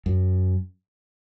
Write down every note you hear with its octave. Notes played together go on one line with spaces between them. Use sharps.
F#2